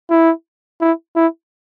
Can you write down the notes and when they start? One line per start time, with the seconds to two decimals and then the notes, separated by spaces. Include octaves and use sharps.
0.10 E4
0.81 E4
1.16 E4